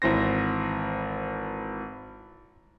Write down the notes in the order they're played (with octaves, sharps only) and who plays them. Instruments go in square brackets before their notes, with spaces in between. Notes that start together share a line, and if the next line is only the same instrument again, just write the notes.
[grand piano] G#1 E3 C5 A#6